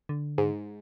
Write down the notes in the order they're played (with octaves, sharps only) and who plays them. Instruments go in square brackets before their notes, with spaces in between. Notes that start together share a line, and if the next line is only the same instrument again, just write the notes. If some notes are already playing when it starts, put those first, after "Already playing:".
[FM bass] D3
[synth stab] G#2